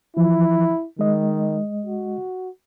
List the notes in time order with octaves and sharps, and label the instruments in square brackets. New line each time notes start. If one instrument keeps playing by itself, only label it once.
[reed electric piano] E3 F3 [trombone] E4
[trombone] D#3 [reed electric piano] G#3 D#5
[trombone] F#4